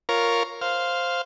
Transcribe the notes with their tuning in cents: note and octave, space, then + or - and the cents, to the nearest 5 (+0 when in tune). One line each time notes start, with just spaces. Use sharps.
F4 +5 A#4 +0 C#5 +0
C5 +0 F5 +0